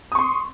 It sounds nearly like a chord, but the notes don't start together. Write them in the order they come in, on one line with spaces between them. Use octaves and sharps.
D#6 C#6 C6